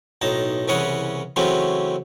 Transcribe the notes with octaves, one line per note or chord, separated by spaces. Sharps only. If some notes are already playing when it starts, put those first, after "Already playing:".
B1 A2 D#4 A5
C2 C#3 E3 C#4 F#5 D#6
C#3 E3 F#3 A3 C4 C#4